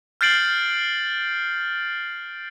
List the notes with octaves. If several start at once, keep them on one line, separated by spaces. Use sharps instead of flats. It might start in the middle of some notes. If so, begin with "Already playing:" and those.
F6 G6 A6 C7 D7 F#7